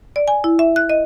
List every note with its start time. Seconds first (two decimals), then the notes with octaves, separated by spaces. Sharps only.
0.16 D5
0.28 G#5
0.44 E4
0.59 E5
0.76 F#6
0.89 D#5